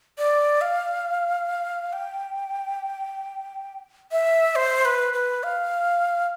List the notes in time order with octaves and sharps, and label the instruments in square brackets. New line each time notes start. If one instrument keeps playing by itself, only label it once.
[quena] D5
F5
G5
E5
C5
B4
B4
F5